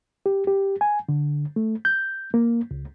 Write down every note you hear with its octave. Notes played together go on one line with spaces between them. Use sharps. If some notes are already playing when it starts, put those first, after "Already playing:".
G4
G4
G#5
D3
A3
G6
A#3
C#2